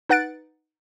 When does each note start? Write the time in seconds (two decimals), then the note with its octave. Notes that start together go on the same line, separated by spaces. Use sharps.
0.09 D#4 B4 F#5 F#6 A6 D7